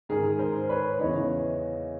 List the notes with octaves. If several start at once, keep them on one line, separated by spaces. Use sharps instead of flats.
G#2 D#3 G#4 A#4
A#4 C5
B4 C#5
E2 C#3 E3 C#5 D#5